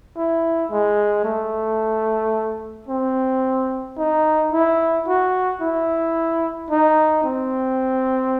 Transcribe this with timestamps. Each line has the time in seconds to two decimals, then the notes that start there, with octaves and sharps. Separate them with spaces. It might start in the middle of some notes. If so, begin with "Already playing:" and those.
0.16 E4
0.71 G#3
1.25 A3
2.88 C4
3.97 D#4
4.52 E4
5.07 F#4
5.61 E4
6.70 D#4
7.24 C4